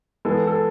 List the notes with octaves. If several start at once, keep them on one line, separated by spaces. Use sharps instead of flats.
E3 G#3 B3 A4
A4